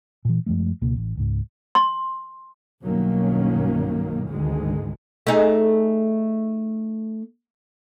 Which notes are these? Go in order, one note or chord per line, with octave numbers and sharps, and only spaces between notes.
A#2 E3
F#2 F3 G#3 A3
C#2 B2 A#3
A1
C#2 G#2
C6
B1 G2 D#3 F#3 A#3 C#4
G#1 D2 D3 D#3 G#3
A3 D#4 G#4